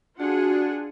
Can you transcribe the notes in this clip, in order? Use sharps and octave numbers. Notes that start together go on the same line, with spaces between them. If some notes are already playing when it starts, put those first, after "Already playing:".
D4 F4 F#4 G#4 F#5